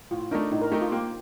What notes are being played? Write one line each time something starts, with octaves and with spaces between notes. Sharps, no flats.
A2 F4
A3 D4 D#4 A#4
A2 D#4
A#4
A3 D#4 G4 A#4
F4
A#3 G4